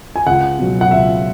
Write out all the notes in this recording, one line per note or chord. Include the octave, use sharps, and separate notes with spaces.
G#5
C#2 F#5
B2 F#3
F#5
C#2 E5